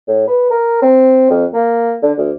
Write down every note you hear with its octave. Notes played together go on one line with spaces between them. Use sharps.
A2
B4
A#4
C4
F2
A#3
D3
D2